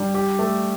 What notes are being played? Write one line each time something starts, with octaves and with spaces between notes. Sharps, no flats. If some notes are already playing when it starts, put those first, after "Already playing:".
Already playing: G3 D4
G4
A3